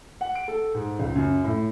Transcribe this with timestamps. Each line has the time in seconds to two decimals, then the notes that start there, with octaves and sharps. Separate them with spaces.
0.21 F#5
0.35 D7
0.48 A4
0.74 G#2
0.99 C#2
1.16 F#2
1.44 A2